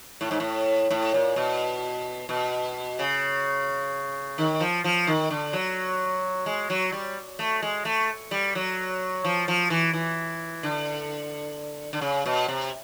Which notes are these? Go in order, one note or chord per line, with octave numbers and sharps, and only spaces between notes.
A2
G#2
A2
A2
A#2
B2
B2
C#3
D#3
F3
F3
D#3
D3
F#3
G#3
F#3
G3
A3
G#3
A3
G3
F#3
F3
F3
E3
E3
D3
D3
C#3
B2
C3